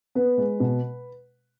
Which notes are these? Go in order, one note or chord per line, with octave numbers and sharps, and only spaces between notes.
B3 B4
G#3
B2